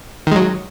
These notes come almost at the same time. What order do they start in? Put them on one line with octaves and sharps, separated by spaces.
D#3 G#3 F#3